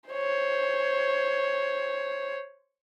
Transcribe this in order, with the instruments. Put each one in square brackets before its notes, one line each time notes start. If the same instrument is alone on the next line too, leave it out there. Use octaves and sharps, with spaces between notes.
[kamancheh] C5 C#5